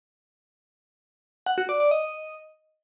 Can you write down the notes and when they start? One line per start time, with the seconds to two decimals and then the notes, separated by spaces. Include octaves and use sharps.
1.46 F#5
1.58 F#4
1.69 D5
1.80 D5
1.91 D#5